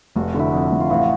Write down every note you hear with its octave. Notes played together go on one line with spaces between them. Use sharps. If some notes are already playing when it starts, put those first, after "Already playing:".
F1 F#4
G4
D3 E4 F#4
F2
F1
F4
A1 E4 F#4